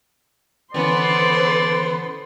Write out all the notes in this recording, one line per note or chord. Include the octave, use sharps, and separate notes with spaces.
D3 E3 B3 C#4 A4 C5 D5 C6